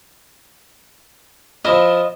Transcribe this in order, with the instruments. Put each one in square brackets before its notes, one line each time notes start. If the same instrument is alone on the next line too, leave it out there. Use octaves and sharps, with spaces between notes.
[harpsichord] F3 E4 F4 [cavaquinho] D#5